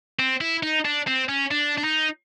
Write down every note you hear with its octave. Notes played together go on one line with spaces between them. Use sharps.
C4
E4
D#4
D4
C4
C#4
D4
D4
D#4